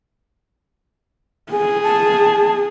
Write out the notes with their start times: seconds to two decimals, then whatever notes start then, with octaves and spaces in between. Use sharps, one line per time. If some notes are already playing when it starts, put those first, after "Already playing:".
1.52 G#4 G#5
1.83 A5